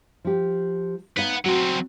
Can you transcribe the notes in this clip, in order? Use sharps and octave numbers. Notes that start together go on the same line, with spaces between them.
F3 G4
D#4 B4 C#5 F5 F#5
F#3 C4 F#4